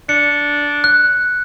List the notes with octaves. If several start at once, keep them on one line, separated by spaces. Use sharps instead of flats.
D4 C#7
F#6